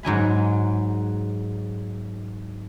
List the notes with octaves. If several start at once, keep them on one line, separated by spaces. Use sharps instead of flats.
G#2 F#3 G#5 B5